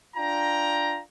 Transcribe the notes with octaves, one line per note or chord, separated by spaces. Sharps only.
D4 F4 G5 A#5